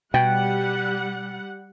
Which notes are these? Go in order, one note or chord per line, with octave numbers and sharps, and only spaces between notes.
B2 G3 F#5 G5